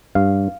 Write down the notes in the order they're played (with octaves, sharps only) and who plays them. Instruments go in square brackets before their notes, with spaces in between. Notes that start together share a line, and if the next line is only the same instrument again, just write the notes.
[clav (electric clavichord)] G2 F5